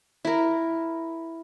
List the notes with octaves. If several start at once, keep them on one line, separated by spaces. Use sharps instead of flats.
E4 A#4